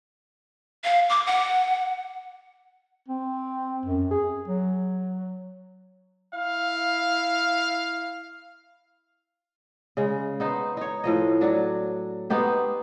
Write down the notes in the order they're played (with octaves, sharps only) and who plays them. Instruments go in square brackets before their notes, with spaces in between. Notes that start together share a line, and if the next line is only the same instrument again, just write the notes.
[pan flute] F5
D6
F#5
[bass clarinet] C4
F#2
G#4
F#3
[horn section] E4 F5
[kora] C#3 G#3
B3 D#4 C5
D#4 C#5
A2 F3 D#5
F#3 D4 F#4
B3 D#4 G4 C5